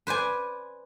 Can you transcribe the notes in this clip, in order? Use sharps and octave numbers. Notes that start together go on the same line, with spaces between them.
B4 C5 D5 G#5